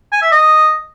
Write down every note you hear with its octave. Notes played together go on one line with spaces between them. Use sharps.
G#5
E5
D#5